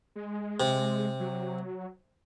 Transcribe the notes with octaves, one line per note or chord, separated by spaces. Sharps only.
G#3
C3
F#3